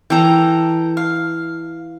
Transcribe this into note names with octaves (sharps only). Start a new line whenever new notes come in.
E3 A4 G5 A#5
F5